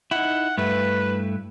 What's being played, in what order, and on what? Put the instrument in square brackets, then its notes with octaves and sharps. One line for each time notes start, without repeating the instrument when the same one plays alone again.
[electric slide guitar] D#4 E4 [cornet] F#5
[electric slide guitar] G2 A3 E4 [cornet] B4